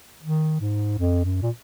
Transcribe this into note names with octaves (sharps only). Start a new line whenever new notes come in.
D#3
G#2
F2
F#2
A#2